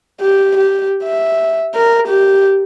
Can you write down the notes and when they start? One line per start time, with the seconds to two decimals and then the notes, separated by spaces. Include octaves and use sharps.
0.20 G4
0.57 G4
1.03 E5
1.75 A#4
2.08 G4